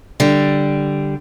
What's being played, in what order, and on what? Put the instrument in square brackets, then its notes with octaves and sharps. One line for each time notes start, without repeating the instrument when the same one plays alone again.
[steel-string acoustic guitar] D3 G3